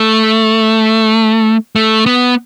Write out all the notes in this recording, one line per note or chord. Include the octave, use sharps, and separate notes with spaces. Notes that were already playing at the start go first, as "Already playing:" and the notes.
Already playing: A3
A3
B3